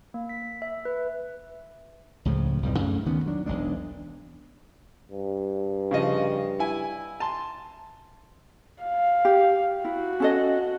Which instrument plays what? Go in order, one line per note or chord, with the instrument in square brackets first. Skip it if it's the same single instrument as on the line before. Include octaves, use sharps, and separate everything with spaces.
[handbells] A#3
B6
E5
B4
[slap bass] C#2 A2 C#3 F3
B1 F2 A2 G3
F#2 C#3 A3 C#4
D2 D#3 B3 C#4
F#3 D4
E1 B1 G#3 D4
[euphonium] G2
[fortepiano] C#3 F3 D#5
E4 G#5
A5 C6
[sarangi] F5
[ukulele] G4
[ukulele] E4 [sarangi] F#4
[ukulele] C#4 A4 D#5